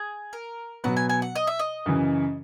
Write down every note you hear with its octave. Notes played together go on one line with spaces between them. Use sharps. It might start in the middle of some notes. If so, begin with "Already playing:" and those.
Already playing: G#4
A#4
B2 F#3 B3 F#5
G#5
G#5
F#5
D#5
E5
D#5
F#2 C#3 E3